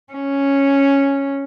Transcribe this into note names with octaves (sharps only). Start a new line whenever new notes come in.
C#4